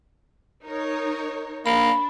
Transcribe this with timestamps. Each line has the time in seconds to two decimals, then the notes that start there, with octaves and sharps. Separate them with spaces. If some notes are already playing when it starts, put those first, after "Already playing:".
0.65 D#4 A#4 C#5
1.66 A#3 D4 B5